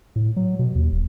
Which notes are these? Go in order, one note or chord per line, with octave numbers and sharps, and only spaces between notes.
A2
F#3
B2
D#2
D1